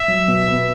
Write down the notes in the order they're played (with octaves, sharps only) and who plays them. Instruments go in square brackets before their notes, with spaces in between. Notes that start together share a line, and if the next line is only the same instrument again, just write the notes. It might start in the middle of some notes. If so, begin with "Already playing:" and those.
Already playing: [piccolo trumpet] E5
[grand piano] F#3
B2
B3